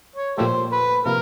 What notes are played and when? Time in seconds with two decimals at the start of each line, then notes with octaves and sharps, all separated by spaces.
0.16 C#5
0.38 A#2 F3 A3 G4 A4 C5
0.72 B4
1.05 C3 F3 A#3 A#4